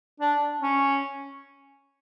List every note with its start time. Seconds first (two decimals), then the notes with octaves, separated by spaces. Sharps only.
0.20 D4
0.62 C#4